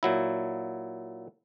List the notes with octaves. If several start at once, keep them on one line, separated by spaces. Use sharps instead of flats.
A#2 F#3 E4